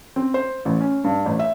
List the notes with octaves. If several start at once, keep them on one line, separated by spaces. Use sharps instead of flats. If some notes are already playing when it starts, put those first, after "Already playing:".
C4
C5
A1
C#4
G2
A1
E5